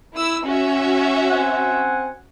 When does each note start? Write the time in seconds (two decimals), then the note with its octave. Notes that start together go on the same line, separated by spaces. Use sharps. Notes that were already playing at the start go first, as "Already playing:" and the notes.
0.13 E4 E6
0.45 C#4 F#4 E5
1.29 C4 F#5 G#5